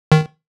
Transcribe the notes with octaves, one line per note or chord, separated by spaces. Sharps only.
D#3